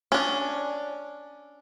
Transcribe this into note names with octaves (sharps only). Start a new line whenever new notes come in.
C#4 D4